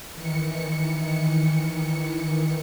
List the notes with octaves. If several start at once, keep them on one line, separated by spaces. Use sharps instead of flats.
D#3 E3 C#7